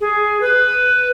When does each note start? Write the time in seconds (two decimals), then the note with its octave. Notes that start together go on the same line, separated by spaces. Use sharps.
0.01 G#4
0.41 B4